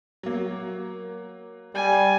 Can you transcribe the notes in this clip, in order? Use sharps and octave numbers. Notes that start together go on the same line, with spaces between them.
F#3 A#3
G3 G#5